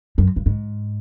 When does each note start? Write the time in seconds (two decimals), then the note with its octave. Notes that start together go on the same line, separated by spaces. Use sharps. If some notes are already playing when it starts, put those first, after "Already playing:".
0.18 F#2
0.36 G2
0.46 G#2